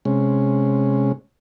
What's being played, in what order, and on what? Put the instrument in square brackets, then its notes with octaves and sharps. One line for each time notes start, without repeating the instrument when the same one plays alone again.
[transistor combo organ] C3 G#3 C#4